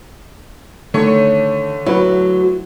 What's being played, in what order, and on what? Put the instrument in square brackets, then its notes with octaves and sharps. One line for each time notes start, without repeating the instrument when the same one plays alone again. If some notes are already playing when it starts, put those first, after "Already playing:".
[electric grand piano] D3 A3 [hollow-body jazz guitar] D#3 [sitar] C#5
[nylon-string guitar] F#3 [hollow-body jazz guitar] E4 B4